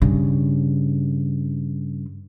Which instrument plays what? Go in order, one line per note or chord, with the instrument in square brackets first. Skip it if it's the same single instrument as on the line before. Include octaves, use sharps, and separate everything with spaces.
[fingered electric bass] G2 [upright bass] C#3